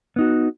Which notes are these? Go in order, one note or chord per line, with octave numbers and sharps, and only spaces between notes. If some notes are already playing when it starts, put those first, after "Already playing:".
B3 D#4 F#4